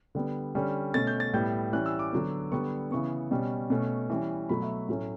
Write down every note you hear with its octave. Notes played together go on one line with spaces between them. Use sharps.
D3 G3 B3
D3 G3 C#4
B2 A3 C#4 A6
G6
A6
A2 G3 B3 G6
E3 G3 C#4 F#6
E6
D6
D3 F#3 B3
D3 G3 B3 C#6
C#3 E3 B3 C#6
B2 G3 C#4
B2 A3 C#4
E3 G3 C#4
B2 F#3 A3 B5
E5
A2 F#3 A3 C#4